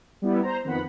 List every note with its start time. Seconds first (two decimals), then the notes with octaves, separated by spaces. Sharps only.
0.22 G3 B3 E4
0.43 C5 A#5
0.64 F2 D#3 B3 F#5 B5